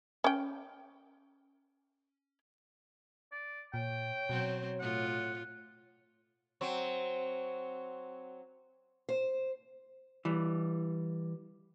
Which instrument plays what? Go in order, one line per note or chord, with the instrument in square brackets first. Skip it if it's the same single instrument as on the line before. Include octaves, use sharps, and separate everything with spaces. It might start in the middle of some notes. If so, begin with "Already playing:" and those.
[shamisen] C#4 G5
[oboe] D5
[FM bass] A#2 [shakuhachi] C#5 [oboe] G5
[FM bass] B2 [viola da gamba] F#3 C4
[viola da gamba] A2 F4 [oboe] F#5
[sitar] F#3 C4
[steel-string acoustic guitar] C5
[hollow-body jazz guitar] E3 G3